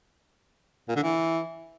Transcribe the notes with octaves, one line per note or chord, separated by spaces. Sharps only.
A#2
D3
E3